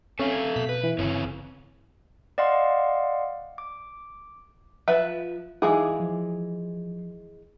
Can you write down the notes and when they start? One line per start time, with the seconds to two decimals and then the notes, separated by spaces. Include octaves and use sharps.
0.19 C4 C#4 A4 E5 F5
0.32 G#6
0.56 B2 B6
0.69 B4
0.84 E3
0.99 G1 C#3 C4 C#5
2.38 D5 D#5 F5 F#5 C6
3.58 D6
4.88 F3 B4 E5
5.62 E3 G#3 D#4 G#4 F5 D6
6.00 F3